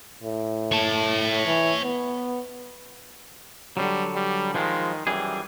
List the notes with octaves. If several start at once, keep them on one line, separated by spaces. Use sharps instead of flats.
A2
C#5 A5
E3
B3
D3 F#3 G3
G3
D#3 F3 G#3
F#2 E3 G3 G#4